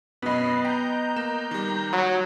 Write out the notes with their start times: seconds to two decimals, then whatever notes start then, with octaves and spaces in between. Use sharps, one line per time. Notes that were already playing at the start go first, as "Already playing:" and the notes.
0.22 F#2 B2 B3 D#5 B5 C7
0.65 G5 A#5 G6
1.16 A#3 E7
1.51 D#3 G3
1.93 F#3 B5 D#6